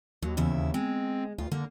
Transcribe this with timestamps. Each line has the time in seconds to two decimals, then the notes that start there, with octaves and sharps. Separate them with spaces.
0.22 D#2 F#3
0.37 E2 C#3 E4
0.74 G#3 C4
1.38 D2 F4
1.52 D3 A#3